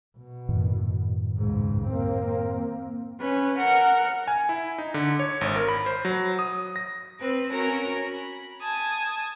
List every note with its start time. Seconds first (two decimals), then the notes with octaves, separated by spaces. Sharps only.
0.18 B2
0.49 F#2 A2 D#3
1.37 C#2 G#2
1.87 A#3 C4
3.20 C#4 B4
3.57 A#4 F#5
4.28 G#5
4.49 E4
4.78 D#4
4.94 D3
5.19 C#5
5.41 G#1
5.56 A#4
5.68 B5
5.86 C5
6.05 F#3
6.39 D#6
6.76 A#6
7.21 C4 B4
7.51 C#4 F#4 A#4 A#5
8.08 B5
8.61 G#5 A5 D#6